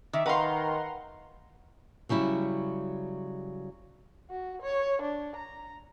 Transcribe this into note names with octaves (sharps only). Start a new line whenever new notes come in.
D#3 E5 D6
D#3 B4 F5 F#5 A#5 C6
C#3 F#3 G3 E4
F#4
C#5
D4
A#5